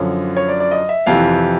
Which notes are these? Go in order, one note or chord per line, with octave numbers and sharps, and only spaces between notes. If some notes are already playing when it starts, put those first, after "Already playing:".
Already playing: F#2 D3 F3 C#5
C#5
D5
D5
D#5
E5
F2 C3 E3 F5